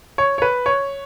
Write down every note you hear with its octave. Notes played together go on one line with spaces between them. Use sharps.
C#5
C#5
B4
C#5